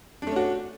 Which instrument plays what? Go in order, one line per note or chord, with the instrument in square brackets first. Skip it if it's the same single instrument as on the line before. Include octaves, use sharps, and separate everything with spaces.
[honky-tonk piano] D4
A3
C#4
F#4